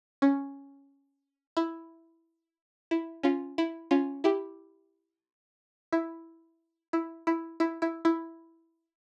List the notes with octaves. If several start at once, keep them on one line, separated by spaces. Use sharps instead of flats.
C#4
E4
E4
C#4 F4
E4
C#4 F4
E4 G4
E4
E4
E4
E4
E4
E4